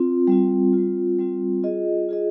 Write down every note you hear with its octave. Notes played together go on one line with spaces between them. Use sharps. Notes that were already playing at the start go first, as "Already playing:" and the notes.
Already playing: C4 F4
G3 C4 F4
G3 C4 F4
G3 C4 F4
F4 G#4 D#5
F4 G#4 D#5